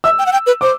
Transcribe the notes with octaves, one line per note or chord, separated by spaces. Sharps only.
E5 E6
G5
F#5
G5
B4
C5 D6